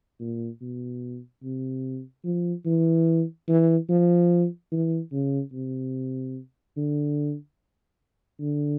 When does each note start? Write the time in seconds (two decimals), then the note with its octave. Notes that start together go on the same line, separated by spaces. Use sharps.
0.20 A#2
0.61 B2
1.43 C3
2.24 F3
2.66 E3
3.48 E3
3.89 F3
4.71 E3
5.12 C#3
5.53 C3
6.77 D3
8.40 D3